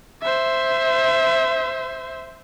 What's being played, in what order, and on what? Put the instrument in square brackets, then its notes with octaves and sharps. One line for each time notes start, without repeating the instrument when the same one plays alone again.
[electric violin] C5 E5